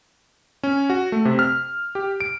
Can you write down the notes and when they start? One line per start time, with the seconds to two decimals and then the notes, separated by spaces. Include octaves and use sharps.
0.63 C#4
0.90 F#4
1.12 A3
1.25 C3
1.39 F6
1.95 G4
2.20 D7